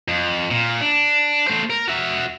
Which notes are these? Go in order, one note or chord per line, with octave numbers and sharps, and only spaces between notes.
F2
A#2
D4
A3 C5
A#4
F#4 E5